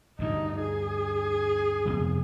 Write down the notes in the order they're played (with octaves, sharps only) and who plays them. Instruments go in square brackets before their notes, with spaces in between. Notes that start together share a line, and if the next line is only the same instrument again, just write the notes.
[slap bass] D2 G2 [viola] D#4
[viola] G#4
[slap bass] F2 C3 B3